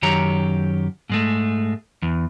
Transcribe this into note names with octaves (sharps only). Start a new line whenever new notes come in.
F#2 D#3 G4 C#5 A#5
G#2 G#3 A3
E2